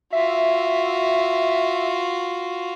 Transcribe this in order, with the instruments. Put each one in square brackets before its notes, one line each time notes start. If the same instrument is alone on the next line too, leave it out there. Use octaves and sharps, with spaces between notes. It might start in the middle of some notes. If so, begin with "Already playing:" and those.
[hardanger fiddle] F4 F#4 [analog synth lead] E5